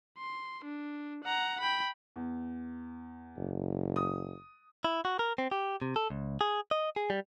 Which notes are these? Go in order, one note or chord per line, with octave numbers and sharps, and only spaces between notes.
C6
D4
F#5 A#5
G5 B5
E2
F#1
D#6
E4
F#4
A#4
C4
G4
C3
A4
C#2
G#4
D#5
G#4
G3